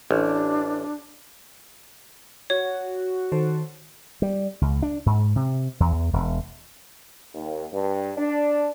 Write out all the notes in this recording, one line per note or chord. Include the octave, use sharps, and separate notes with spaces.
A1 D4
F#4 C#5
D#3 A4 C5
G3
C#2
D4
G#2
C3
E2
E2
E1
D#2
G2
D4